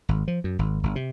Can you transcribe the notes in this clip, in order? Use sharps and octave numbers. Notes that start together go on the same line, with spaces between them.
G#1
F3
F#2
G#1
G1
C3